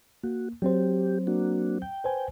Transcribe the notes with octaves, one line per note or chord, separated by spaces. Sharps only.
A#3 F#4
F#3 C4 G4 C5
A#3 D4 F#4
G5
B4 C5 G#5